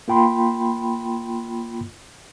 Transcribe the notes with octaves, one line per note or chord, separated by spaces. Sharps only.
A#3 F4 G5 B5 C6